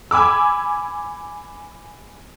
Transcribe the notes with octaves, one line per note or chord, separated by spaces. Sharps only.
G#5 B5 D6 E6